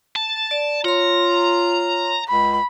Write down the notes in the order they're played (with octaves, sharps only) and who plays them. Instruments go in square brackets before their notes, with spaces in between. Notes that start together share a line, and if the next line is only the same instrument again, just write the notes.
[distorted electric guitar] A5
[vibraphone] D5
[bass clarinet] F4 [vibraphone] C#5 C6 [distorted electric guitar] A#5
[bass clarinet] C#2 [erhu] B5